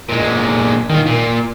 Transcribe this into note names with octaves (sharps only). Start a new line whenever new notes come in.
A#2 G#3
D#3 F4
A#2